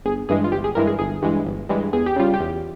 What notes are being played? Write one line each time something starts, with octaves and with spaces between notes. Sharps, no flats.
G1 G#4
G2 E3 G#3 G#4
F4
G1 G4
G#4
G2 E3 G#3 A#4
G#4
G1 G#4
G2 E3 G#3
G1
G2 E3 G#3
E2 G#4
G4
C#3 G3 F4
G4
E2